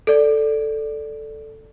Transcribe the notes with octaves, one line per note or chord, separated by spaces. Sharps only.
A4 D5